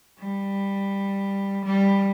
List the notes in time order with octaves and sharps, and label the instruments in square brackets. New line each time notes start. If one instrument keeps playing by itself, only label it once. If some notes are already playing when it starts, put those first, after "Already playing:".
[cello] G3
G3